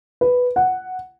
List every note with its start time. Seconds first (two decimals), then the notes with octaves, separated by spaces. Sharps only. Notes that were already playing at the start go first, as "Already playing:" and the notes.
0.21 B4
0.56 F#5